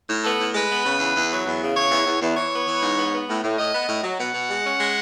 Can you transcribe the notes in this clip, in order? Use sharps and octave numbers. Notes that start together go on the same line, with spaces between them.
A2
B3 A4
A2
G#3 B4
B3
C#3
E2
E2
F#3
E2
C#3
E2 C#5
E2
E2
E2
E3 C#5
B3
E3
G#2
B3
B3
A2
A2
A2 D#5
B3
A2
F#3
B2 F#5
B2
G#3
C#4
G#3